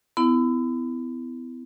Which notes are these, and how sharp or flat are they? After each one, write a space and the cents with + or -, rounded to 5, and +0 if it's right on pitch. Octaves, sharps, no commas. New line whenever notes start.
B3 +35 E4 +0